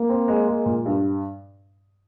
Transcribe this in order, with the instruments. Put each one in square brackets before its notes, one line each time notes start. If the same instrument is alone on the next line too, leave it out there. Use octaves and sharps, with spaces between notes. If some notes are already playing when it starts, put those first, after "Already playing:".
Already playing: [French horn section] A#3
[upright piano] C4
G#3
G#3
A#2
G2